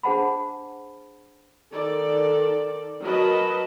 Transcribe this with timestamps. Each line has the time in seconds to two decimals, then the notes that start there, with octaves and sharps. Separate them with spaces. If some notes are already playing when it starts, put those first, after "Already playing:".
0.03 D4 G#4 C5 F#5 A5 B5
1.72 D#3 A4 D5
3.01 F#3 A#4 B4 D#5 A5